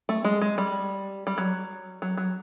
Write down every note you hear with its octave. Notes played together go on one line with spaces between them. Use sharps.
A3
G#3
G#3
G3
G3
F#3
F#3
F#3